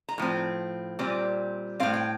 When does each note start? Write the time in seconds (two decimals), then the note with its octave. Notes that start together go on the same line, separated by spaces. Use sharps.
0.09 A#5
0.18 A2 F3 C4
0.99 A#2 G3 C4
1.80 A2 A3 C4 F5
1.94 G5